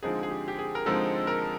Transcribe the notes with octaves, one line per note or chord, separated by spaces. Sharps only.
D3 F3 G#3 C4 D#4 G#4
G#4
G4
G4
G#4
A#4
D3 F3 G#3 C4 D#4 A4
A#4